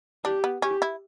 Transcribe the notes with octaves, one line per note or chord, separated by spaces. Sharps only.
D4 G4
B3
C#4 G4
E4